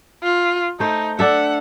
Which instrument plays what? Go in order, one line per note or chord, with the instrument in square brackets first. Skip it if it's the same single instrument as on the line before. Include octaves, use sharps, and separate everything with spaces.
[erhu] F4
[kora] A3 C5 [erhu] D#4
[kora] D4 A4 E5 [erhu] F#5